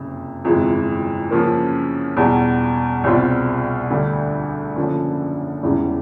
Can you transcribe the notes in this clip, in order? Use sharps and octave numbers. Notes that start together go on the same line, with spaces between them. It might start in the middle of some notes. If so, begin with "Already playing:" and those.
Already playing: F#1 F2 C3
G1 F2 C3 E3 G#3
F#2 C#3 F3 A#3
E2 B2 G3
C2 B2 G3 C4 F4
D2 D3 G3
F#1 F#2 D3 F3
E1 E2 C#3 E3 G3